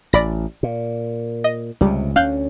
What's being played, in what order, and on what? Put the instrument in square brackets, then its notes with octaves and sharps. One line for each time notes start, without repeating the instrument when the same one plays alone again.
[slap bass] A1 [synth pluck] D5 B5 A#6
[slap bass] A#2
[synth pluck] D#5
[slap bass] C#2 C3 [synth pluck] G3
[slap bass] D2 C#4 [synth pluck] F5 F#6 G6